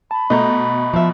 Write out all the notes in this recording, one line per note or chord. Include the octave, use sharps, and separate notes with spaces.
A5 B5
B2 A3 D#5 A#5 G6
F3 E5